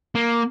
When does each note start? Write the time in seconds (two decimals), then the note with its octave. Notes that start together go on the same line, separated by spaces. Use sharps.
0.15 A#3